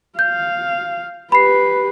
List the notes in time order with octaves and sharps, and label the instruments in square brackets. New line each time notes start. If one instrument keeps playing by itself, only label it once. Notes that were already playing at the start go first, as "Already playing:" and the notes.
[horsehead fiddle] F5 [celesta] G6
[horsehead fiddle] G4 B4 [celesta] B5 C7